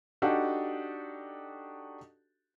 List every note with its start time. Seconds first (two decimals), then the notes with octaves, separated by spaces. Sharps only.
0.22 D4 D#4 F#4 G4 A4